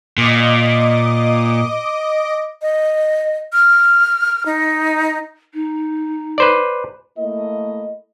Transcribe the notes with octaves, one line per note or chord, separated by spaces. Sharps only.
A#2 D#5 D6
D#5
F6
D#4
D#4
B4 C5 D5
A3 A#3 E4 D#5